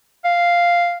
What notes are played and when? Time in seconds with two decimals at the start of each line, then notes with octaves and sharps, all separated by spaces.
0.24 F5